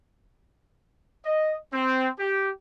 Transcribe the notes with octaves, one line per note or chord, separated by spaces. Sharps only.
D#5
C4
G4